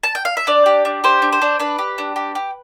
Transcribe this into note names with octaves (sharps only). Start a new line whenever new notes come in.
A5
G5
F5
E5
D4 D5
G4
D4
G4 C5
D4
C5
D4
D4 B4
G4
D4
G4
G4